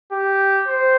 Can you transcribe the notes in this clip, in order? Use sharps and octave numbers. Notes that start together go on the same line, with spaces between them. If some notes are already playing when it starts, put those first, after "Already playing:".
G4
C5